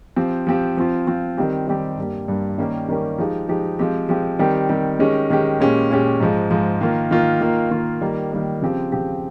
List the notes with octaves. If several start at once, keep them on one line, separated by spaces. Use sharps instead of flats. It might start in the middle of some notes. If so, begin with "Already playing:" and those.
F3 C4 G4
F3 C4 G4
F3 C4 F4
F3 C4 F4
D#3 G3 C4 G4
D#3 G3 C4 G4
G2 G3 A#3
G2 G3 A#3
D#3 G3 A#3 C#4 G4
D#3 G3 A#3 C#4 G4
F3 G#3 D#4 G4
F3 G#3 D#4 G4
F3 G#3 C4 G4
F3 G#3 C4 G4
D#3 G3 C4 G4
D#3 G3 C4 G4
D#3 G#3 C#4 G4
D#3 G#3 C#4 G4
A#2 G#3 C#4 G4
A#2 G#3 C#4 G4
G#2 F3 G#3
G#2 F3 G#3
D#3 A#3 F4
D#3 A#3 F4
D#3 A#3 F4
D#3 A#3 F4
D#3 G3 A#3
D#3 G3 A#3
C#3 F3 C4 G4
C#3 F3 C4 G4